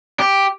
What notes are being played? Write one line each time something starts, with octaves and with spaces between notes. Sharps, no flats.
G4